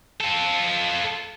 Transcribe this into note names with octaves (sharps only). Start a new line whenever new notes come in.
F4 A4